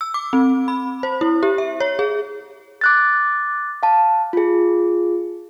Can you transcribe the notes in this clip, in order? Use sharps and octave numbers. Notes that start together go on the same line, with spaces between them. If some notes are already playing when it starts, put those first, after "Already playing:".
E6
D6
C4
B5
C5
E4
G4
E5
C#5
G#4
D6 F#6 A6
F5 A5
F4 G#4